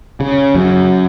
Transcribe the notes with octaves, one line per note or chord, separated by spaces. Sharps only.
C#3
F#2